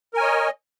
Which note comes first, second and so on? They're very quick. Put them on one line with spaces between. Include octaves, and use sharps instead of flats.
A#4 G#5 C#5 D#5